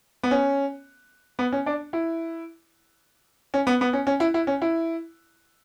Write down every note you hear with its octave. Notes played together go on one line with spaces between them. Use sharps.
B3
C#4
B3
C#4
D4
E4
C#4
B3
B3
C#4
C#4
E4
E4
C#4
E4